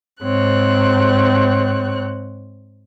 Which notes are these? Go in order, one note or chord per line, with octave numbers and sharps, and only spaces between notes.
G#2 C4 C#5 F#6